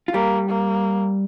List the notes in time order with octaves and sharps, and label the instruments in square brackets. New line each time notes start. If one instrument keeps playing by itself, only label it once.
[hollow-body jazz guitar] F4
[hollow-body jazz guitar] G3 G4 [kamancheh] A#3
[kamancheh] A#3